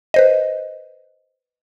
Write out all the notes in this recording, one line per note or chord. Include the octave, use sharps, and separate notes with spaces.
B4 C5 D#5